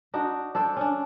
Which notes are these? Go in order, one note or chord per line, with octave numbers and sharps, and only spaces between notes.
D4 D#4 F#4
D4 A4 C5 D5
C#4 D4